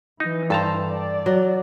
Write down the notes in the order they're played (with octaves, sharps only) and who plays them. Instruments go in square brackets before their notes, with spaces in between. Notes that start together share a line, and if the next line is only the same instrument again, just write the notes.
[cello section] E3 [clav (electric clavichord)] D#4
[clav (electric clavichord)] G2 A5 A#5 [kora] A4 C5
[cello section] D5
[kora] F#3